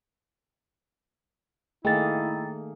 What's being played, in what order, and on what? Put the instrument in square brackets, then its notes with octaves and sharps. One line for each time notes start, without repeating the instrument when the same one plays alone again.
[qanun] D#3 A#3 [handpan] A3 G#4 [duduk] E4 [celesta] G5 A6